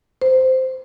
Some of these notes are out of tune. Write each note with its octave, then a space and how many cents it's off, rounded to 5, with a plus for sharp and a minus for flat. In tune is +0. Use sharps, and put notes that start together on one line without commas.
C5 -10